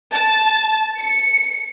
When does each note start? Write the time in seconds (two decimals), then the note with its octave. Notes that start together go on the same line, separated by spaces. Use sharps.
0.13 A5
1.02 C#7